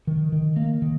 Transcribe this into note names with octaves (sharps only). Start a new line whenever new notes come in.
D#3
D#3
A#3
D#3